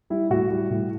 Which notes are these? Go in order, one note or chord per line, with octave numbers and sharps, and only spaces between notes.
G3 E4
A2 F#4
G3
A2